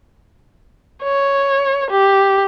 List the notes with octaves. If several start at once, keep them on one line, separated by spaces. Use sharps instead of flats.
C#5
G4